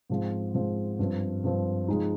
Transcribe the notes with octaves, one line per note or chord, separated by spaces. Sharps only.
G#2 F3 C4
G#2 F3 C4
G2 F3 C4
G2 F3 C4
F3 G#3 D#4